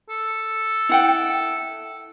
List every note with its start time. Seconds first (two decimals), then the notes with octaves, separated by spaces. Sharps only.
0.10 A4
0.89 E4 F#5 G5